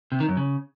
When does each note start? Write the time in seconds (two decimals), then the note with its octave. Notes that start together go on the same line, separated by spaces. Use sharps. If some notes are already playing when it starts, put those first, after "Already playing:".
0.12 C3
0.20 D#3
0.29 F#2
0.37 C#3